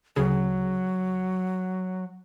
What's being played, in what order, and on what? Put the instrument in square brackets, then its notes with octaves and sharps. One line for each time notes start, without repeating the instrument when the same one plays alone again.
[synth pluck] D2 C#3 G#4 [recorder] F#3